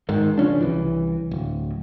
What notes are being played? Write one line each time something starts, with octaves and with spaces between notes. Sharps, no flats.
G#1 G#2 D#3
C#3 F3 C#4 D4
C2 E3
D1